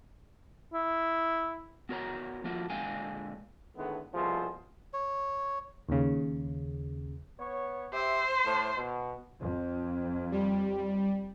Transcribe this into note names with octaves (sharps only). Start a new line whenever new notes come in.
E4
B3 F#4 A#4 C#5 A#5
F3 A3 A#3 F4 F#4
A#2 D3 G#3 F5 G5 G#5
A2 D3 D#3 G#3 A3 B3
C2 B2 F3 A3 G#4 C5
C#5
D#2 C#3
B3 C#5
G4 C5 E5
A2 A3
B2
F2
G3